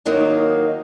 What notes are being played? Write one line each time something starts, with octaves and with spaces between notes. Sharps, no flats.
D#2 D#3 F#3 A#3 D#4